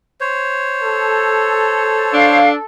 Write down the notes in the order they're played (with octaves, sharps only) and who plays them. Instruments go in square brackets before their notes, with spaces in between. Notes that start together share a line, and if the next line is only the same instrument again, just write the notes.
[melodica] C5 C#5
[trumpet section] A4
[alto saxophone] D4 [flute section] F5